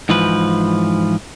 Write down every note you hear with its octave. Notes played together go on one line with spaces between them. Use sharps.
G#2 E3 F3 B4